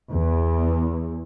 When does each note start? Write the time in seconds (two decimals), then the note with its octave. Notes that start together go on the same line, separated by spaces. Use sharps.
0.12 E2